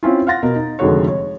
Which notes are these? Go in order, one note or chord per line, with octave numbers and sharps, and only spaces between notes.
C4 C#4 E4 F4
F5 F#5 C6 A6 A#6
B2 A#4
D#4
F1 D3 D#3 G#3 F#4 C#5
C#5